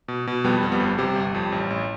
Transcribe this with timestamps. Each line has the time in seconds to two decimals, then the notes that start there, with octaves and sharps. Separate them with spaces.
0.08 B2
0.27 B2
0.44 F2 G3 B3
0.63 F2
0.72 G3 B3
0.80 G1
0.98 C3 G3
1.16 G1
1.34 F2
1.52 A1
1.70 A1